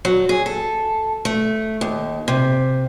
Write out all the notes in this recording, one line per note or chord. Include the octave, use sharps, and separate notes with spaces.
F#3
G#4
A4
A3
D#2
C3